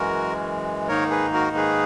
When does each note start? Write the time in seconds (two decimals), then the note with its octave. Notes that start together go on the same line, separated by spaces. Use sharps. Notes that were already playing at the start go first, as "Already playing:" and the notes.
Already playing: F#2 E3 G#3 F#4 A#4
0.88 G#2 D#3 A#3 D#4 A#4 C#5
1.10 G#4 B4
1.33 F#4 A#4
1.56 G#4 B4